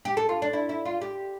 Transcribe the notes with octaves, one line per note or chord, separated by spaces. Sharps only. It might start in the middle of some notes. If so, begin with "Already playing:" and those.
G4
A4
F4
D4
E4
E4
F4
G4